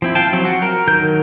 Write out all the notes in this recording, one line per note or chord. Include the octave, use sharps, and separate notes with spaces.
F3 C4 E4
F5 G5 A5
F3 F#3 C4
F#4
A#4
D#3 F#3 A#4 G6